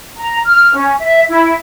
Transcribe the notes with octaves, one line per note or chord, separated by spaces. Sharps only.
A#5
F6
C#4
E5
E4